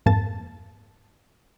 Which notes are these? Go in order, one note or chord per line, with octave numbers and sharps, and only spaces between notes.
F2 G#2 A#3 A5 A6